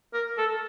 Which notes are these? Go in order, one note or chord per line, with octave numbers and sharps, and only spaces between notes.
A#4
A4